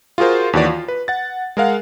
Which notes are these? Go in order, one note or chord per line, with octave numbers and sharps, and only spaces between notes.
F4 F#4 G#4 A#4 C5
D#2 E3 F#4 D5
F4
B4
F#5 A6
G#3 A#4 F5 F#5